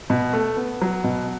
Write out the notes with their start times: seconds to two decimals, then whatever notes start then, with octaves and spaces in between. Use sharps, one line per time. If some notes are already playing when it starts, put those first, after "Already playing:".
0.10 B2
0.33 A3
0.57 B3
0.81 F#3
1.04 B2